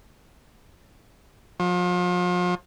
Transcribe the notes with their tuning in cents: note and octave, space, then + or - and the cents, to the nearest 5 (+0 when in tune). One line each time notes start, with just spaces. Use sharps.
F3 +40